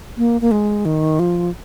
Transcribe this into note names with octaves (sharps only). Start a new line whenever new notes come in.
A#3
A#3
G#3
D#3
F3